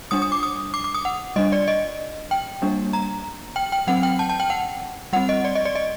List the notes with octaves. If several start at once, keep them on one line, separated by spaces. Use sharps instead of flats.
G3 D4 D#6
D#6
D6
D#6
D6
D6
D#6
F#5
G3 D4 D#5
D5
D#5
G5
G3 A#3 D4
A#5
G5
G5
F#3 C4 F#5
G5
A5
A5
G5
F#5
G3 C4 F#5
D#5
D5
D#5
D5
D#5